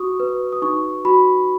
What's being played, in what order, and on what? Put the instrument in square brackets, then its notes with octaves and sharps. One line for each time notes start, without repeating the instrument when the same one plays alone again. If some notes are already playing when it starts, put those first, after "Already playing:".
Already playing: [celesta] F#4 C#6 D#6
B4
D#6
D#4 C#6
F#4 B5